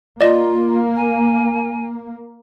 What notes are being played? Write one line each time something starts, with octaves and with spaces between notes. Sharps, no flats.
A#3 F4 D5 D#5
G#5